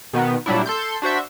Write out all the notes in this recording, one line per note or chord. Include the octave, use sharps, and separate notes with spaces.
B2 D#3 B3
A#2 F#3 G3 D4 E4
A4 C6 G6
D4 F#4 C5 E5